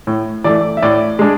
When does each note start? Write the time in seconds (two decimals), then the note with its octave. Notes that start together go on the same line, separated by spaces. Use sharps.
0.07 A2
0.44 E3 A3 D5
0.77 E5
0.82 A2 D5
1.19 G#3 D4